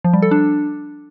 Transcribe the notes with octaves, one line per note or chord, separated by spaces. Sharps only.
F3
G3
A4
D4